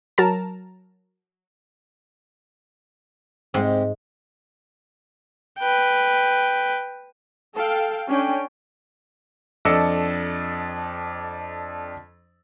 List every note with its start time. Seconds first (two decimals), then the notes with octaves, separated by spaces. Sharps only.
0.18 F#3 A#4 A5 A#5
3.54 G#2 C3 G#3
5.59 B4 G5
7.56 A4 F5 G5
8.08 C#4 D4 G5
9.65 F2 D4 A4 D#5 E6 C#7